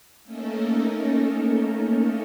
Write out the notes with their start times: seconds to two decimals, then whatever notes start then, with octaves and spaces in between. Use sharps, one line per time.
0.24 A3 A#3 C#4 D#4 A4 A#4